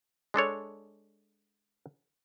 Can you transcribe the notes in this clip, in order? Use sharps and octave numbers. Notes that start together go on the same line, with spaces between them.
G#3 D4 A4 C#5